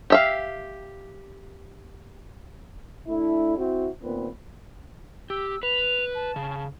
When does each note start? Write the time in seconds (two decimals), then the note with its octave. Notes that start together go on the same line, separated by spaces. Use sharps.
0.10 G4 E5 F5
3.07 A3 D4 E4
3.57 C4 E4 F#4
4.02 D#2 A#2 B3 C4 B4
5.30 G4 E6
5.63 B4 F7
6.15 A5
6.36 C#3